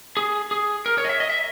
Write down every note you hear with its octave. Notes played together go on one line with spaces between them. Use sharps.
G#4
G#4
A#4
C#5
D#5
E5
D#5
E5